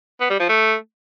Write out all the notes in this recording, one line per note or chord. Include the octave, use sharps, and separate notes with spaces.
B3
G3
F3
A3